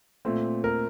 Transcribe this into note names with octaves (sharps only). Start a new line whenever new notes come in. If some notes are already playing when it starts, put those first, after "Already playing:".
A#2 A3 C4
A#4